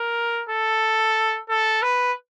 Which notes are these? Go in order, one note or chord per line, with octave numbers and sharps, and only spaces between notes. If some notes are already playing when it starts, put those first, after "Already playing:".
Already playing: A#4
A4
A4
B4